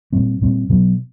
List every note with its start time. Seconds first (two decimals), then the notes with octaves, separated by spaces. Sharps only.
0.13 A#2 G3 C4
0.41 A#2 G3 C4
0.69 B2 F#3 B3